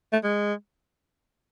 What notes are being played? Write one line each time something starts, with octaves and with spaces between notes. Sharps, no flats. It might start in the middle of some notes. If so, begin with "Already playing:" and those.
A3
G#3